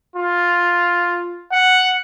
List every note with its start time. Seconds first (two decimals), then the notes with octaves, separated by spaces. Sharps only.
0.16 F4
1.52 F#5